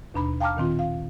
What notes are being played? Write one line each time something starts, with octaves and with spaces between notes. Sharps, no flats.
D#2 B2 D4 A#5 B5
F5 G5 A5 A#5 D6 F6
A#2 D#3 C4 F4
F5